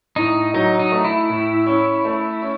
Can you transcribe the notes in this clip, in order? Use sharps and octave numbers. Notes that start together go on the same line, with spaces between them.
A2 D#4
F#3 D#4
D#4
A3
E4
A2
C#4
A3
C#4